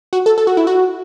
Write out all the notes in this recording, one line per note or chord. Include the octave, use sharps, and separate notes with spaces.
F#4
A4
A4
F#4
E4
F#4